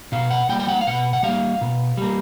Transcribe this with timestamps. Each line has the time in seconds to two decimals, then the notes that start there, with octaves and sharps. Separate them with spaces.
0.12 B2 F5
0.31 F#5
0.49 G3 A#3 G5
0.60 G5
0.69 F#5
0.81 F5
0.87 B2 F#5
1.13 F#5
1.23 G3 A#3 F5
1.61 B2
1.97 G3 A#3